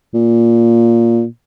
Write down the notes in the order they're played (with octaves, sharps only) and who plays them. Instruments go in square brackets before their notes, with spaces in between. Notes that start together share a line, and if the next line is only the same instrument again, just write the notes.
[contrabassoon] A#2